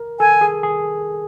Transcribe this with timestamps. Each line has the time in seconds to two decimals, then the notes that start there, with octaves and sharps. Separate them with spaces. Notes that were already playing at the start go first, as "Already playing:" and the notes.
Already playing: A#4
0.20 A4 G#5
0.41 G#4
0.63 G#4